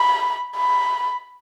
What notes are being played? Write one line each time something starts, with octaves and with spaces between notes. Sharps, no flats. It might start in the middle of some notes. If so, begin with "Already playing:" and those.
Already playing: B5
B5